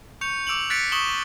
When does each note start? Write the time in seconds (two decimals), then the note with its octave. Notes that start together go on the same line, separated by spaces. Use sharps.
0.21 C#6 G6 C#7 F7
0.47 D6 E6 D7 F7 F#7
0.70 F#6 A6 B6 C#7 D7
0.92 C#6 D#6 E7 F#7 G7